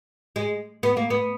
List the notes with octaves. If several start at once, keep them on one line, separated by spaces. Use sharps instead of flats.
G#3
B3
A#3
B3